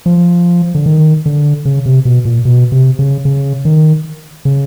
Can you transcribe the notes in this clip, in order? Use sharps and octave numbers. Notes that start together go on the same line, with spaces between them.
F3
D3
D#3
D3
C#3
C3
B2
A#2
B2
C3
C#3
C#3
D#3
C#3